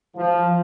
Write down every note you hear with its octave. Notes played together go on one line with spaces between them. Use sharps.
F3